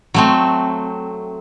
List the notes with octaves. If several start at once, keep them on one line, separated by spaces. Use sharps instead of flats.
F#3 A3 C4